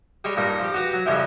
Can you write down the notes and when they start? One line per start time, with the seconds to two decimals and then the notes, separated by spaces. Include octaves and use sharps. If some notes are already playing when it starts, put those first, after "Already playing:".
0.24 G3 G#3 C#5 G5
0.37 G2 A#2 D#4 A#4 D#6
0.60 F3 G4
0.74 F#4 G4 B4 A#5
0.93 F#3
1.06 F2 C#3 G3 G#3 C4 E4